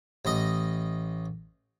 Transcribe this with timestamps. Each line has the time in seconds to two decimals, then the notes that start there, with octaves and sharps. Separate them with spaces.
0.25 A1 D#5